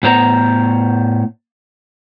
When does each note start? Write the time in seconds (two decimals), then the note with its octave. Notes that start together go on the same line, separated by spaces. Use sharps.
0.03 A2 B3 C5 A#5